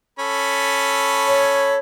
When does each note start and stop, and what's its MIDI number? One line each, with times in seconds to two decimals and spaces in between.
0.19 1.76 61
0.19 1.76 69
0.19 1.76 83
1.27 1.79 73